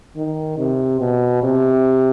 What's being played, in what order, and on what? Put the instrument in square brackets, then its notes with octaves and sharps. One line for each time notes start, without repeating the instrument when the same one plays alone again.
[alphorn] D#3
C3
B2
C3